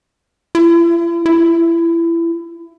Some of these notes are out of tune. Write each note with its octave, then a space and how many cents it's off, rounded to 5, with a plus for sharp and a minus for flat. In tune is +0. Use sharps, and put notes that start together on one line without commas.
E4 +45
E4 +25